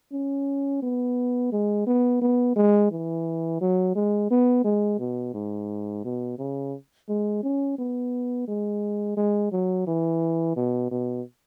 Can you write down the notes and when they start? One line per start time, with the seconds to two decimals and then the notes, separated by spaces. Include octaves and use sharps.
0.12 C#4
0.82 B3
1.52 G#3
1.87 B3
2.22 B3
2.56 G#3
2.91 E3
3.61 F#3
3.95 G#3
4.31 B3
4.64 G#3
4.99 B2
5.34 G#2
6.05 B2
6.38 C#3
7.09 G#3
7.43 C#4
7.78 B3
8.48 G#3
9.17 G#3
9.52 F#3
9.87 E3
10.57 B2
10.91 B2